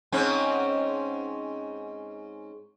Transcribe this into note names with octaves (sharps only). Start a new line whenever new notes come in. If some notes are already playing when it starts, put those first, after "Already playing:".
G#2 C4 C#4